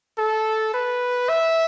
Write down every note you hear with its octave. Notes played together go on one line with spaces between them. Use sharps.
A4
B4
E5